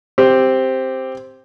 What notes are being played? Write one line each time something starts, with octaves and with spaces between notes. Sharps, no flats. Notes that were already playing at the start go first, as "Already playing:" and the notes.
C4 G4